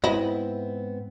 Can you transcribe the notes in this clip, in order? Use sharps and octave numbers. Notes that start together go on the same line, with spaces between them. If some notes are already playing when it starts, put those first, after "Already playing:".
G#2 B3 C4 E4 D#5